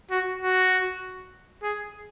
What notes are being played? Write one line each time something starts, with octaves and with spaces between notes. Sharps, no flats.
F#4
F#4
G#4